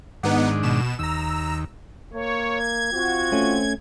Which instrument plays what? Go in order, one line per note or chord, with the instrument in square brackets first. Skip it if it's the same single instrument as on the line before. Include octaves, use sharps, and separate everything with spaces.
[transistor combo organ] G#2 D#3 D4 [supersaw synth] B3 D#4 F#5
[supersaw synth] B2 E7
[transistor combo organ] D#2 [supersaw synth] A#5 E6
[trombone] A#3 [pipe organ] C#5
[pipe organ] G#6
[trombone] C4 [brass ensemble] F4 F#4
[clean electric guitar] A3 C#4